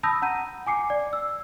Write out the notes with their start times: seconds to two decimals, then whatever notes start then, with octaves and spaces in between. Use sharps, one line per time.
0.03 A5 B5 D#6 E6 G6 A#6
0.22 F#5 A#5 G6 D#7
0.67 G#5 D6 C7 C#7
0.90 D5
1.13 E6